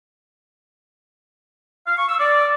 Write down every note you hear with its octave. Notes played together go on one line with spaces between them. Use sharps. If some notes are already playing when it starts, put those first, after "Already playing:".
F5
C#6
E6
D5